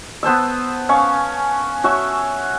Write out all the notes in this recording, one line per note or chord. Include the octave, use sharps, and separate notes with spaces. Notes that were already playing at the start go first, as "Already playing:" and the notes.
B3 C5 A5 E6
C#4 F5 C#6
F#4 C#5 E5